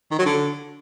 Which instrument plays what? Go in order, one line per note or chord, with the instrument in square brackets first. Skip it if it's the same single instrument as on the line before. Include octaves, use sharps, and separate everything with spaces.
[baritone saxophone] D#3
F#3
D3